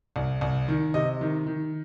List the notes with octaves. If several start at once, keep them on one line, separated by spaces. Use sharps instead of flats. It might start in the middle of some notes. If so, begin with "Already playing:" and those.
C2
C2
D#3
C3 D#5
D#3
D#3